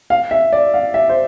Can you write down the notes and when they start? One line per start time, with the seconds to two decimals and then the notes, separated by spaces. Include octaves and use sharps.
0.10 F5
0.31 E5
0.53 D5
0.74 F5
0.94 E5
1.09 C5